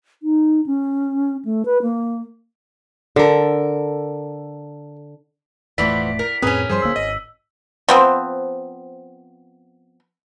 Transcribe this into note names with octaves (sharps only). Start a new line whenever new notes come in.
D#4
C#4
A3
B4
A#3
D3 A4 A#4
E1 A2 E3 F3 A3 B3 D5 B6
A#4
F2 A2 C4 C#4 G#4 A#4 B4 D#6
G2 F3 G3 G#4 C5 C6
D#1 D2 A#3 E6
G#1 D#5
F3 B3 C4